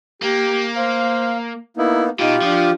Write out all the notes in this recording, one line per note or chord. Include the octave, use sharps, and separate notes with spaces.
A#3 G4
C5 F5
A#3 B3 D#4 E4
B2 D#4 F4 G4
F3 D4